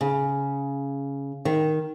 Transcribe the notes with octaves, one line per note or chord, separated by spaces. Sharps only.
C#3
D#3